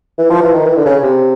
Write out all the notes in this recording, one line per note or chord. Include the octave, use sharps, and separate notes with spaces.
E3
F3
E3
D#3
E3
D3
C#3
C3